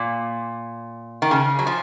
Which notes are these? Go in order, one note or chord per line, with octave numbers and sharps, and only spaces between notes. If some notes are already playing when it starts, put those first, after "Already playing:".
Already playing: A#2
D#3
C#3
F#3
F3